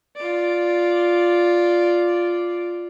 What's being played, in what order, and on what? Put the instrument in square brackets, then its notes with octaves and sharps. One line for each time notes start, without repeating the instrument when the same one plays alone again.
[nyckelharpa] F4 D5